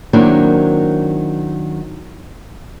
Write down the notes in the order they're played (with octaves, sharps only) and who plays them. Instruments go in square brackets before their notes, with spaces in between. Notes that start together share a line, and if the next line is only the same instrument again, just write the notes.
[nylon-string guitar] D#3 F#3 A#3 C4 D4 E4